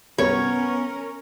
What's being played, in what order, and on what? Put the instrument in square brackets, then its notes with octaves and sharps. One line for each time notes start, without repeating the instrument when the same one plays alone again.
[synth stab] C2 G2 [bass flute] B3 [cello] C#4 A#4 [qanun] C#5